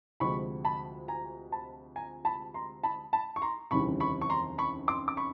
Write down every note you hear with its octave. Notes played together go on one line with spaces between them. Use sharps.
D2 C3 F3 G#3 B5 C#6
A5 B5
G#5 A#5
A5 B5
G#5 A#5
A5 B5
A#5 C6
A5 B5
A5 B5
C#6
A#5 C6
F1 D#2 C#3 E3 G3 B5 C#6
B5 C#6
C#6
A#5 C6
B5 C#6
C6 D6
D6
B5 C#6